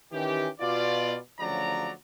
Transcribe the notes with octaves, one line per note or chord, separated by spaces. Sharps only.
D#3 E3 C#4 G4
B2 F4 D5
D2 C#3 F3 F#3 D5 A#5